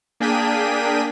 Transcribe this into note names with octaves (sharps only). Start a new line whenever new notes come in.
A#3 D4 G#4 G5 B6 D#7